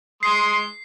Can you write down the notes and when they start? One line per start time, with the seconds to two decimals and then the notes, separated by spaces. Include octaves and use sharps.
0.23 G#3 C6 D#6 C7